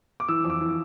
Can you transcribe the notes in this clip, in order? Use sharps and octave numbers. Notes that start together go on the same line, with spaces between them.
D6
E3 E6
F2
D6
E3